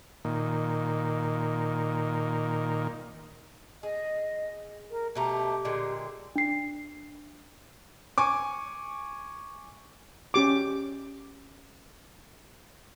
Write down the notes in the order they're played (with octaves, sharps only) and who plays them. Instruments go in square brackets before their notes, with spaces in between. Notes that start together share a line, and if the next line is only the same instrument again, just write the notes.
[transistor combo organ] A#2 D#3
[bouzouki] G#4 [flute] D#5
[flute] A#4
[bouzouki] B2 A3 A#5 [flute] G4
[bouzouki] A#2 D3 G#3
[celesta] D4 C7
[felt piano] G#5 C#6 D6
[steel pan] C#4 G4 D6